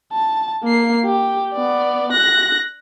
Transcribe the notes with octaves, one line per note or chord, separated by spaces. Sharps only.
A5
A#3 C7
G4
B3 D5
F#6 A#6